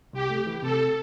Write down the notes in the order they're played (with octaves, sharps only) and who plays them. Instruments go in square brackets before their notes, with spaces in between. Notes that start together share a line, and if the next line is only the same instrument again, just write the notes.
[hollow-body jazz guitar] C2 [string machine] G4
[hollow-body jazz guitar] A3
E3
[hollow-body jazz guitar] C3 [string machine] A4